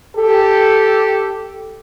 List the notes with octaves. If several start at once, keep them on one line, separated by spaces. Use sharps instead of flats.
G4 A4